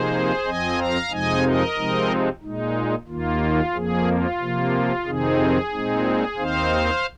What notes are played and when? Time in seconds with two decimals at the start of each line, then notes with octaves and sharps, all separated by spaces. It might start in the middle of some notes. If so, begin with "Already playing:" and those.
Already playing: C3 F3 A#3 D#4 G#4 C5
0.45 F2 F3 C4 D#5 G#5
0.77 F5 A#5
1.10 F2 C3 F3 G#3 D#4 D#5 G#5
1.43 A#4 D#5
1.76 C3 F3 G#3 C4 D#4
2.42 A#2 G#3 D#4
3.08 D#2 D#3 A#3 F4
3.73 F2 F3 A#3 G#4
4.07 F4
4.40 C3 F3 A#3
5.05 F2 C3 D#3 C4 D#4 G#4
5.71 A#2 G#3 C4 D#4
6.37 D#2 D#3 C4 D#4 C5 F5